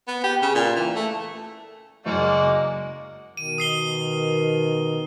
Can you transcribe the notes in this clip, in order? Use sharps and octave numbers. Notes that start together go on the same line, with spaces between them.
B3
G4
C#3
A#2
E3
A3
F#1 F#2 G#3 A#3 F#4 D5
B2 D#3 D#7
D#6 C7 G7